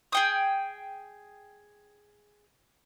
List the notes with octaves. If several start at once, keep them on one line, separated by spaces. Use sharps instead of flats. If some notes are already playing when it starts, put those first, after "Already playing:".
G#4 G5 D#6